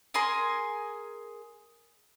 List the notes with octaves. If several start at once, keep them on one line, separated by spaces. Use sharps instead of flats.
G#4 A#4 G#5 C6